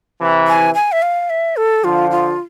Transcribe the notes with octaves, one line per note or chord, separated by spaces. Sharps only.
C3 E3
G#5
G#5
E5
F5
E5
A4
D3 F3 F4
F4